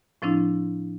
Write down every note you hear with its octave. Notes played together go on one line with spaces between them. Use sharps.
A2 F3 C4 D4 E4